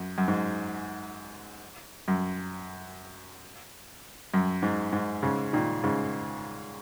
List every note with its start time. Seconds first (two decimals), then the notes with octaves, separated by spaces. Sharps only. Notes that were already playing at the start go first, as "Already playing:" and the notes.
Already playing: F#2
0.18 F#2
0.28 G#2
2.08 F#2
4.34 F#2
4.62 G#2
4.93 G#2
5.23 G#2 C#3
5.53 A#2 D#3
5.84 G#2 C#3